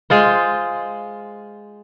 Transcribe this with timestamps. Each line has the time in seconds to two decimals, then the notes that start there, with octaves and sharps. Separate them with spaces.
0.10 G#3 F4 C5